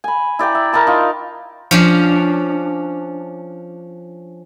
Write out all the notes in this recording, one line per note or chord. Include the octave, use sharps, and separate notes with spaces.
G#5 B5
E4 D5 G5 A#5
E5
A#4 E5 A5 B5
D#4 F4
F3 C#4 D4